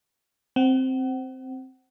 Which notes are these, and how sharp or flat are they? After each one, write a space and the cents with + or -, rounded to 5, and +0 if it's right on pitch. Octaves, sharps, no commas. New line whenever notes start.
C4 +0 F#5 +35